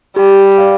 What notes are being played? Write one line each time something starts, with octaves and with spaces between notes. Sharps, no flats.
G3 G4
D5 F5